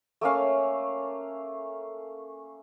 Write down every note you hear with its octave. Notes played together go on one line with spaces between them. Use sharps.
A3 A#3 C#4 F5